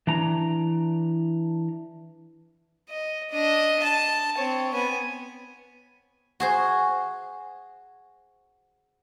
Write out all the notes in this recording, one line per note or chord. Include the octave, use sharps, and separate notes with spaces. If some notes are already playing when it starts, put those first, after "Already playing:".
E3 D4 A#5
D#5
D4 D#5
A5
C4 C#5
B3 G#5
F#4 G#4 C5